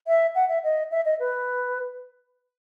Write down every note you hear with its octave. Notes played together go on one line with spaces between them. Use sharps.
E5
F#5
E5
D#5
E5
D#5
B4